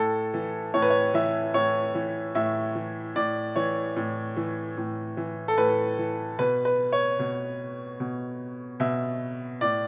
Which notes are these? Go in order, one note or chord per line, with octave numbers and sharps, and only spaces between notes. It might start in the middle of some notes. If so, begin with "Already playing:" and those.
Already playing: A2 A4
E3
A2 C#5
B4
C#5
E3 E5
A2 C#5
E3
A2 E5
E3
A2 D5
E3 C#5
A2
E3
A2
E3
A4
A2 B4
E3
B2 B4
B4
C#5
B2
B2
B2 E5
A2 D5